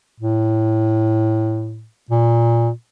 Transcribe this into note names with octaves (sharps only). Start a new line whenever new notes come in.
A2
A#2